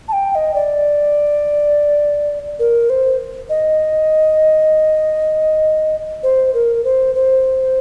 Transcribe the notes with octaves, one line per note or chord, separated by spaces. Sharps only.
A5
G5
G5
D#5
D5
A#4
C5
D#5
C5
A#4
C5
C5